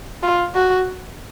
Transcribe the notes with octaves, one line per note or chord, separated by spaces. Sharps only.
F4
F#4